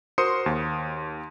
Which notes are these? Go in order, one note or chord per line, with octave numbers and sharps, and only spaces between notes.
F#4 A#4 C5 C6 D#6 C#7
D#2